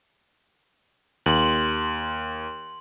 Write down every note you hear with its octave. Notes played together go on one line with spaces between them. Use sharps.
D#2 C6 F#7